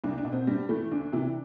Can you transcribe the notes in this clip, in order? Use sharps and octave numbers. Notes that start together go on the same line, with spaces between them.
C2 D4
D4
B2
C4
G2 G3
E3 A3
D2 D4
C3 E3